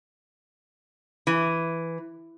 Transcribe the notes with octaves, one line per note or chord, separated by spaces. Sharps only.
E3